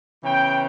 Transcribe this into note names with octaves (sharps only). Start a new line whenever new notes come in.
C#3 E3 B3 G5